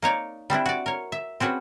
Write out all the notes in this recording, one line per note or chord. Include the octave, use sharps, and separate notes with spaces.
A#3 D#4 C#5 D5
G3 C4 D4 E4
F#4 D5
A#4 C#5
E5
C4 C#4 F#4 G#4 B4